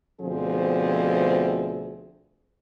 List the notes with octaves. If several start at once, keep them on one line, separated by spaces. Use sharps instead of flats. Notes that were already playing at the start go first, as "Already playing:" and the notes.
D2 B2 F3 C4 G#4